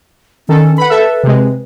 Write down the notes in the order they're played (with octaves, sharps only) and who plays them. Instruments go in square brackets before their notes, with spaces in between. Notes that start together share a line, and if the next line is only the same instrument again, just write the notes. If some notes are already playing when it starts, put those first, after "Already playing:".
[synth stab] D#3 A4 [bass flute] C#4
[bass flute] B4 [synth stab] F#5 B5
[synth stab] A4 E5
C3 G#3